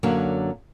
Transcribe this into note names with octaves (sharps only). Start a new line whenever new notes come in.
F#2 D3 F#3 A#3